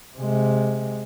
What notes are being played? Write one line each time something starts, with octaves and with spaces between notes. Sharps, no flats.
C3 G#3